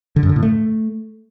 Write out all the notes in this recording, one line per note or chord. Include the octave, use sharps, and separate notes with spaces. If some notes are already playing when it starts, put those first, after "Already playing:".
D3
F#2
D3
A2
A3